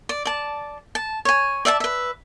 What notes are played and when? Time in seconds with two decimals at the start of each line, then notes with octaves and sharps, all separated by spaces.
0.09 D5
0.25 D5 A5
0.95 A5
1.25 C#5 G#5
1.65 D5 E5 F5 A5
1.80 B4 E5